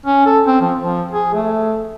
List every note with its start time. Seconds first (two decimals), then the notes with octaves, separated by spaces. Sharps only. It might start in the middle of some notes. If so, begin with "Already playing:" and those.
0.06 C#4
0.26 A4
0.46 C4
0.61 F3
0.80 F3
1.11 G#4
1.33 A3